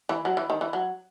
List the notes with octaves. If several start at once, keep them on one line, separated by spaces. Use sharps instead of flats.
E3
F#3
E3
D#3
E3
F#3